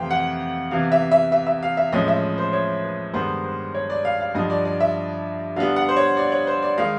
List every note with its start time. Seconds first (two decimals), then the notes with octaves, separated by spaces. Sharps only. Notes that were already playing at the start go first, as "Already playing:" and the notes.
Already playing: F2 C3 E3 A3 C5 F5 G5
0.11 F#5
0.71 E2 C3 E3 F5
0.92 E5
1.12 E5
1.32 E5
1.47 E5
1.63 F5
1.77 E5
1.92 A2 F3 G#3 C#4 D#5
2.08 E5
2.23 D#5
2.38 C5
2.53 C#5
2.83 B4
3.14 G2 D#3 G#3 B3 C5
3.44 C5
3.75 C#5
3.90 D5
4.05 F5
4.20 F5
4.35 G2 D3 F3 D#5
4.50 D5
4.65 D5
4.80 E5
5.56 D3 G3 B3 F5
5.76 F#5
5.89 C5
5.97 C#5
6.17 D5
6.32 C#5
6.47 C5
6.63 D5
6.77 D#3 G#3 F5